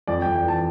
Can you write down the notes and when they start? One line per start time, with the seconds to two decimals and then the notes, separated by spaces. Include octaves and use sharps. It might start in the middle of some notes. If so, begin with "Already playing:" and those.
0.07 F2 D5
0.22 G5
0.26 F2
0.35 G5
0.44 E3 A5